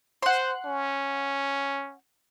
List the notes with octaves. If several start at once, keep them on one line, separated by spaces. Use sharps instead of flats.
C5 F#5 C6
C#4